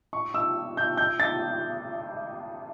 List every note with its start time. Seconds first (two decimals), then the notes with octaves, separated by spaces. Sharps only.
0.13 C#6
0.34 E6
0.77 G6
0.97 G6
1.20 A6